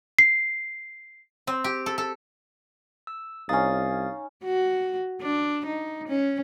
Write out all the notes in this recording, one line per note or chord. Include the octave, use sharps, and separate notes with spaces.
C7
C4
G4
A4
A4
E6
C2 C#4 D#4 F5 D#6 A6
F#4
D4
D#4
C#4